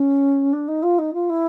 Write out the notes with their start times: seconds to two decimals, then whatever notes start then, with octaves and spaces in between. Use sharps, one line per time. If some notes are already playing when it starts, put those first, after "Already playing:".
Already playing: C#4
0.53 D4
0.68 D#4
0.83 F4
0.98 D#4
1.14 F4
1.29 E4